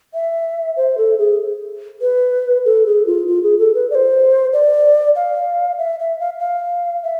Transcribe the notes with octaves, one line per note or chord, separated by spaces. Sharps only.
E5
C5
A4
G#4
B4
A4
G#4
F4
F4
G#4
A4
B4
D5
C5
D5
F5
E5
E5
F5
F5
E5